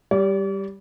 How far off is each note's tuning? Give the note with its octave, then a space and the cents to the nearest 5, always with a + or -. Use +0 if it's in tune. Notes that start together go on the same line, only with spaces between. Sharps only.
G3 +0 D5 -40